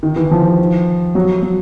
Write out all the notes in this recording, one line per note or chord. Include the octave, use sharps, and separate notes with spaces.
D#3
E3
F3
F#3
F#3